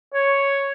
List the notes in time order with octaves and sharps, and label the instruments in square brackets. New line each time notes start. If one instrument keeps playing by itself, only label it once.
[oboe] C#5